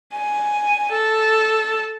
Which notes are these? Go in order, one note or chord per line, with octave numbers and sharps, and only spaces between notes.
G#5
A4